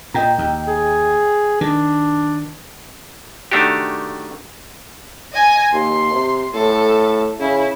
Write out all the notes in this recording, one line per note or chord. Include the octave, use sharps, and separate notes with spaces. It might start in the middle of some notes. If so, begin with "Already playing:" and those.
A#2 D#5 G5 A#5
D#2
G#4
D#3 D4
D#3 A3 D4 F#4 G4
D#5 G#5
D#2 C6
C3
A2 A4
C#3 E4